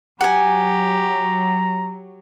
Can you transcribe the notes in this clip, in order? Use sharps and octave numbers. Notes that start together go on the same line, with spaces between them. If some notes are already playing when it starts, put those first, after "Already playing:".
F#3 G4 F#5 G#5 A#5